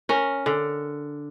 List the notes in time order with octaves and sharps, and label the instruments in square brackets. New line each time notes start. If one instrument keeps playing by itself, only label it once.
[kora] C#4 A#4
D3